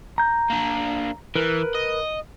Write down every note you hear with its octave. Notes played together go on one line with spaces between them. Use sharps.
A#5 G6
A#3 D4
E3 A#4 B4
D#5